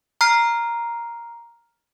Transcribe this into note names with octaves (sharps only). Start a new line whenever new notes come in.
A#5 F6 C7